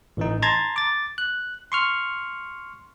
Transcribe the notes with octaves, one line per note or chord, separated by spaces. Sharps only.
A1 E3 D#4
A5 A#5 C6 G#6 A6
D6 A6
F#6
C6 C#6 F6